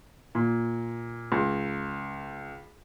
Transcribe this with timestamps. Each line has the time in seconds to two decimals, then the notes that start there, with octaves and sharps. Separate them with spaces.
0.35 A#2
1.32 C#2